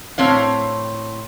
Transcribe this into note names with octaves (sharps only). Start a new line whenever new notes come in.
A2 C4 C#5 F5